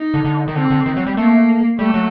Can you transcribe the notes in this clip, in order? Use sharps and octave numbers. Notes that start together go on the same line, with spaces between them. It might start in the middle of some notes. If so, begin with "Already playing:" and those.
Already playing: D#4
D3
D3
D#3
D3 C4
D3
D#3
F#3
G3
A3 A#3
G3 A3
F#3